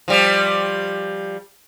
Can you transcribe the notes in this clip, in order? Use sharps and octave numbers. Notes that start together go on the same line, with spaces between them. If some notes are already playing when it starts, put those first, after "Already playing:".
F3 G3